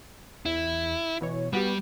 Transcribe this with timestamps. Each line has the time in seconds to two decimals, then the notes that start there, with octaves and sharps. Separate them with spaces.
0.46 E2 E4
1.21 B2 E3 C#5
1.53 G3 B3 F#4 G4